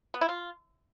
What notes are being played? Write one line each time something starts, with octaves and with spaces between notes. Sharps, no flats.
B3
E4
F4